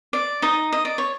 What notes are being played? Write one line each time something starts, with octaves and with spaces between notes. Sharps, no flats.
D5
D#4 D#5
D#5
D5
C#5